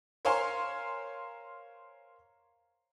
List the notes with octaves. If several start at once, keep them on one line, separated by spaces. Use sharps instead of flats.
A#4 C5 C#5 F5 G#5 C6